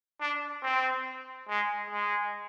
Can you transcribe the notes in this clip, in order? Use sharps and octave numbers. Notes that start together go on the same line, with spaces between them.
D4
C4
G#3
G#3